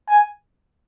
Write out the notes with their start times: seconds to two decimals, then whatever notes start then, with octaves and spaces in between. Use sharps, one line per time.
0.09 G#5